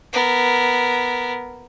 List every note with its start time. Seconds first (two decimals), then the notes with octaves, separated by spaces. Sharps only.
0.13 B3 A#4